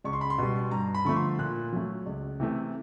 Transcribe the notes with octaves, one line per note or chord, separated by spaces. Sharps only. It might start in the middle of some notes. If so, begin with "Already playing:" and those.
C#2 C#6
C6
B5
C6
B2 G3
G2 A#5
B5
D3 F3 A3 C#6
C6
A#2 F#6
F#3 A3
C#2
C3 E3 A3